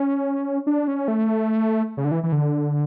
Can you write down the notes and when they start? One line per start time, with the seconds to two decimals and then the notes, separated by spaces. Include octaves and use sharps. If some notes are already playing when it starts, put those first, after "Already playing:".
Already playing: C#4
0.67 D4
0.88 C#4
1.08 A3
1.97 C#3
2.05 D3
2.11 E3
2.23 E3
2.32 D3